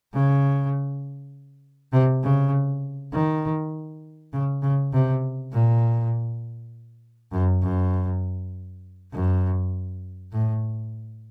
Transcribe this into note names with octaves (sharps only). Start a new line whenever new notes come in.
C#3
C3
C#3
D#3
C#3
C#3
C3
A#2
F#2
F#2
F#2
A2